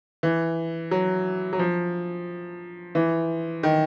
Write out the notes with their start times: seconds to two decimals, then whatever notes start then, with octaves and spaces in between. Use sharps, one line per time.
0.23 E3
0.91 F#3
1.53 F#3
1.59 F3
2.95 E3
3.63 D#3